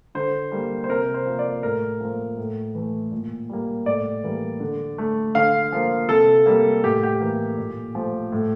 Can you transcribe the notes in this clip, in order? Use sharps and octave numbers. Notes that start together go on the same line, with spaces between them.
D3 C5
G3 A#3
C5
C3 A#4
C5
F3 A#3
D5
A2 A#4
F3 A#3
A2
E3 A3
A#2
G3 A#3
A2 D5
E3 G3 A#3
D3
A3
D3 F5
F3 A#3
C3 A4
G3 A#3
A2 G4
G4
E3 A#3
A#2
F3 A3
A2